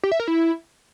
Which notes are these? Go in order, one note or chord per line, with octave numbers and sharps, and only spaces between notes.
G4
E5
A#4
E4